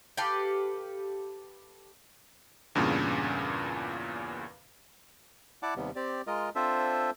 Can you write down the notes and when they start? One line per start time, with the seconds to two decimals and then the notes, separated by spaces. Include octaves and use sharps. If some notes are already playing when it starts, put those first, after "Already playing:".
0.17 G4 A4 B4 F5
2.75 E2 G2 A#2 C#3
5.63 E4 D5 F#5 A5 D6
5.76 D#2 C3 G3 B3
5.96 C4 G4 D5
6.27 G#3 F4 A#4 D#5
6.56 C4 D4 F4 A4 C5 E5